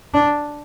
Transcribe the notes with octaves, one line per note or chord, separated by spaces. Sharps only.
D4